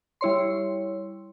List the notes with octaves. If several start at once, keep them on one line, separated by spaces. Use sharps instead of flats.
G3 E4 C#5 C6